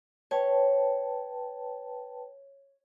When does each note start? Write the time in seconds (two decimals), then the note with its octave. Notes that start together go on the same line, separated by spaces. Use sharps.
0.31 B4 C#5 G5 A5